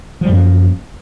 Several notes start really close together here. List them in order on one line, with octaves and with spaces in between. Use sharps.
F3 G3 F#2 A#3